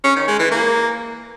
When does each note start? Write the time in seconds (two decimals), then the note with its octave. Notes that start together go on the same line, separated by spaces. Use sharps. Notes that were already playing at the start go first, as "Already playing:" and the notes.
0.04 C#4
0.16 D#3
0.28 G#3
0.39 E3
0.51 A#3